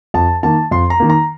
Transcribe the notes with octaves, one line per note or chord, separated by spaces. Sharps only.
F2 A5
D#3 A#3 A5
F2 C6
A#5
D#3 A#3
A#5